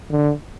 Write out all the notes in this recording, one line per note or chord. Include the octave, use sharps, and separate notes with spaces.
D3